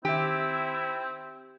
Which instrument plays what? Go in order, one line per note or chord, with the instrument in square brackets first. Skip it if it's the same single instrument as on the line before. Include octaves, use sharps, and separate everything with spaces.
[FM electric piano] D#3 E5 [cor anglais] C4 [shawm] E4 [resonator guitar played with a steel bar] G4